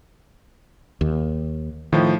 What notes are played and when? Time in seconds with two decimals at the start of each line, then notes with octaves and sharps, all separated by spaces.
1.01 D#2
1.93 A2 D#3 F3